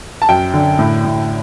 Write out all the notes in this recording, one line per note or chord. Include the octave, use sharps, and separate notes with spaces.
A5
F#2 G5
D3
A2
A2